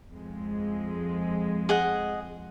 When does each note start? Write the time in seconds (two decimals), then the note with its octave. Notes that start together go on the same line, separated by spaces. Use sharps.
0.11 F2 G#3
1.69 G#4 D#5 F#5